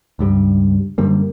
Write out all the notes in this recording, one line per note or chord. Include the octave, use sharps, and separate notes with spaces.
C#2 G2 G3
F#2 D3 G3 A#3